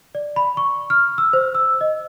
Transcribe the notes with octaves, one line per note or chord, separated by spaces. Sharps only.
D5
B5
C#6
F6
E6
C5
E6
D#5